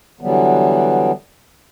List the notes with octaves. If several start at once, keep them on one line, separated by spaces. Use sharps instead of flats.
D3 E3 F#3 G3 B3